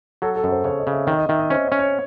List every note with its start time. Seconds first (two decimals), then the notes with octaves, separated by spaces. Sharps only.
0.22 F#3 A4
0.36 A4
0.44 F#2
0.51 C5
0.64 C#3 C#5
0.79 D#5
0.87 C#3
0.93 E5
1.07 D#3 E5
1.18 D#5
1.29 D#3 E5
1.39 D#5
1.50 C#4 C5
1.64 C#5
1.72 C#4
1.79 C#5